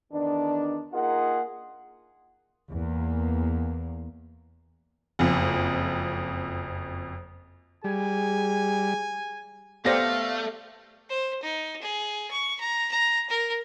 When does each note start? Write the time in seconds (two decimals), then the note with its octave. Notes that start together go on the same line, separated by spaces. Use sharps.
0.12 E2 D#3 B3 D4
0.93 A#3 D#4 F4 G#4 A#4 F#5
2.71 E2 A#3
5.19 F#1 F2
7.84 G3 G#4 G#5
9.85 A3 B3 G4 A4 C5 D5 F5 A#6
11.09 C5
11.42 D#4
11.82 G#4
12.31 C#6
12.60 A#5
12.91 A#5
13.29 A#4